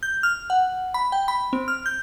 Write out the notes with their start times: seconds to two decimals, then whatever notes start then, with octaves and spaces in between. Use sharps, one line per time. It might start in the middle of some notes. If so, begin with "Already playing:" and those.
0.03 G6
0.23 F6
0.50 F#5
0.94 B5
1.12 G5
1.28 B5
1.53 C4
1.68 F6
1.86 G6